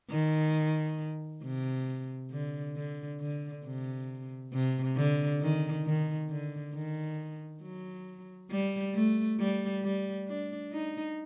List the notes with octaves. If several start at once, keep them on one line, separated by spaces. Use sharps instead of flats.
D#3
C3
D3
D3
D3
C3
C3
D3
D#3
D#3
D3
D#3
F#3
G3
A3
G3
G3
D4
D#4